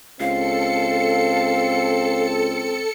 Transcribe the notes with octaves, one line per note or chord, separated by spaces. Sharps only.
C#2 C4 A4 F5 C#7